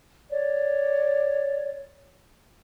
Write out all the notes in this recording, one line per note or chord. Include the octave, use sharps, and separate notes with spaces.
C#5 D5